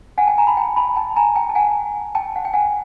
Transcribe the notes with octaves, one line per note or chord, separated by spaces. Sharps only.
F#5 G#5
G5 A5
G#5 A#5
A5 B5
G5 A5
A5 B5
G5 A5
G#5 A#5
G5 A5
A5
F#5 G#5
G5 A5
F#5
G5
F#5 G#5